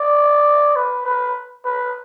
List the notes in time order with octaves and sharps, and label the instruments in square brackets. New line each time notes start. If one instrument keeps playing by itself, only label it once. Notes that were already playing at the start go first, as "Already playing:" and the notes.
Already playing: [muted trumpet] D5
B4
B4
B4